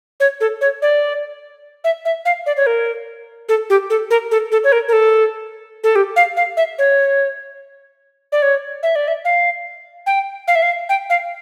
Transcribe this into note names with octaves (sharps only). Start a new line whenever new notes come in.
C#5
A4
C#5
D5
E5
E5
F5
D5
C#5
A#4
A4
G4
A4
A#4
A4
A4
C#5
A#4
A#4
A4
A4
G4
F5
F5
E5
C#5
D5
C#5
E5
D5
E5
F5
G5
F5
E5
F5
G5
F5